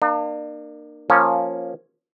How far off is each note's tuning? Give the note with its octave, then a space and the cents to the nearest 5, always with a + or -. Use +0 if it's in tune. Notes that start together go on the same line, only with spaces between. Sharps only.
A#3 +0 D4 +40
F3 +10 A#3 +0 C#4 -5